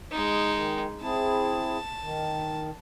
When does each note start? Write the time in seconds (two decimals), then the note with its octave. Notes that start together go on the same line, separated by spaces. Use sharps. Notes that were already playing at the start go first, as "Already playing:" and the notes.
0.11 G#3 D#4
0.55 D#3
1.02 C4 E4 G#4 A5
2.02 D#3